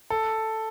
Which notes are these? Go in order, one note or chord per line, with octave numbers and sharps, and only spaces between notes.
A4